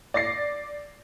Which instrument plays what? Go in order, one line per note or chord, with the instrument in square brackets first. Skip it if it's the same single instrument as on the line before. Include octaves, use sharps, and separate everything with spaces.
[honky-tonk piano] D5 A6 A#6 C7